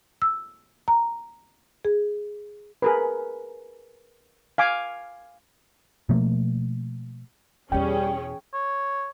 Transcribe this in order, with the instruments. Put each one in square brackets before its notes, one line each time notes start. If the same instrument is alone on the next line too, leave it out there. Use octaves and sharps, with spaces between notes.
[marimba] E6
A#5
G#4
[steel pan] G#4 A#4 B4
F5 G#5 D6
[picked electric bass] B2 F3 A3 A#3
[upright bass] E2 B2 [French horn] G3 [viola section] C#4 G#4 [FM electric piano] G5
[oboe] C#5